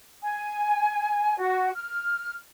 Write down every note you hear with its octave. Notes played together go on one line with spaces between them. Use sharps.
G#5
F#4
F6